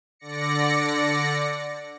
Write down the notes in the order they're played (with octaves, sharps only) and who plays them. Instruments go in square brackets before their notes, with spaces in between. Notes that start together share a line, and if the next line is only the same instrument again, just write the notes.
[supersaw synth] D3 D5 A#6 C#7